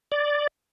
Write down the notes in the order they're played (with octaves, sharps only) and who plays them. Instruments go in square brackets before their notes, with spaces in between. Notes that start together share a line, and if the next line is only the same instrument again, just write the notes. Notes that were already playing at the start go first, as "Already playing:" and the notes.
[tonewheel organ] D5